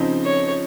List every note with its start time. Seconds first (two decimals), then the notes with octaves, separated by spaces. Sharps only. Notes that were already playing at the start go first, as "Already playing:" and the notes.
Already playing: C#3 F3 C4 D#4
0.24 C#5